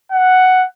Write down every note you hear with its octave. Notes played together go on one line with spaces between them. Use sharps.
F#5